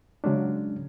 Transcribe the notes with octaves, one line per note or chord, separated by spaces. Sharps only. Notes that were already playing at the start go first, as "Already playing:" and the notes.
C#3 F#3 G#3 C#4 D4